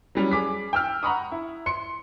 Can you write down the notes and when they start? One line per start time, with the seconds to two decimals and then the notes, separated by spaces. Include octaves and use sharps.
0.15 F#3 G3 C#4
0.31 G#4 D6 B6
0.73 G5 E6 F6
1.03 F#5 A#5 B5 C#6 D#6
1.32 E4
1.66 C6 C#7